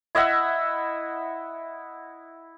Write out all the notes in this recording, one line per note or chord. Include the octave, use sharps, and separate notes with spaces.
E4 D#5 E5 F#5